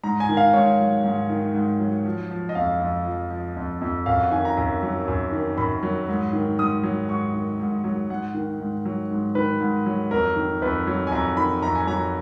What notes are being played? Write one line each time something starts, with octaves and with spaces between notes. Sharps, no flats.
G#2 A#5
G#5
D#3
F5
G#2 C#5
F#3
G#2
D#3
G#2
F#3
F3
F3
D#5
F2 F5
F2
F3
F3
F2
F2
F#2 F5
F#5
D#3 G#5
A#5
F#2
F#3
F#2
D#3
F#2 B5
F#3
G#2
D#3
G#2 D#6
F#3
G#2 C#6
D#3
G#2
F#3
G#2 F#5
D#3
G#2
F#3
G#2
D#3 B4
G#2
F#3
F2 A#4
D#3
F2 B4
F#3
G#5
F2 A#5
D#3 B5
F2 A#5
G#5
F#3 A#5